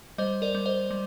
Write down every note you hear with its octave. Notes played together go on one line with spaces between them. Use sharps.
G3 C5 D#5
A#4 D5
G3
C5 D#5
G3